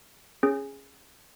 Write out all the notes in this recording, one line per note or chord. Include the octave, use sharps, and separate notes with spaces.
C#4 G#4